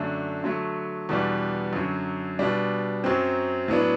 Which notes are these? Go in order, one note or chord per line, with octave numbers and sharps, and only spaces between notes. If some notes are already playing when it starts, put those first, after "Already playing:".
Already playing: F#2 D3 A3 D4
D3 F#3 A3
E2 B2 G3 D4
F#2 D3 F#3
B2 G3 D4
F#2 F#3 C4
A2 F#3 B3 D4